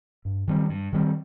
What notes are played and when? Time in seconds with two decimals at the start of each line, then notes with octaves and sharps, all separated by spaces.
0.25 G2
0.47 D#3 G3 C4
0.70 G2
0.92 D#3 G3 C4